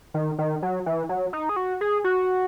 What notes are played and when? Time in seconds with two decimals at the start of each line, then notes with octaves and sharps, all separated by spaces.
0.14 D#3
0.38 D#3
0.63 F#3
0.86 E3
1.09 F#3
1.33 D#4
1.49 G#4
1.56 F#4
1.81 G#4
2.04 F#4